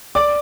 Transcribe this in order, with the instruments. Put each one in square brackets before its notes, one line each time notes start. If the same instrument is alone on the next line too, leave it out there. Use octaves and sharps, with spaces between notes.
[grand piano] D5 D6